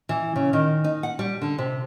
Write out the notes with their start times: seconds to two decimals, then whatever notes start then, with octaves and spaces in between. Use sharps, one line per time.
0.09 E3
0.36 C#3
0.53 D#3
0.84 D#4
1.03 F#5
1.19 G3
1.42 D3
1.58 C3